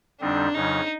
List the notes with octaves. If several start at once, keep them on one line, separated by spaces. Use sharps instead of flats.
F2 D3 G3 C4 D4 D#4
F2 C#3 F#3 D#4